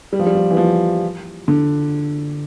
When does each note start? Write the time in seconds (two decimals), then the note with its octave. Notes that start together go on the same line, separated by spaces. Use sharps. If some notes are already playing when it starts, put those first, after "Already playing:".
0.13 G3
0.19 F3
0.27 G3
0.35 F3
0.51 E3
0.57 F3
1.48 D3